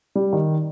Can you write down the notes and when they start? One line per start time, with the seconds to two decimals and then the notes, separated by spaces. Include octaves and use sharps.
0.15 G3
0.33 D#3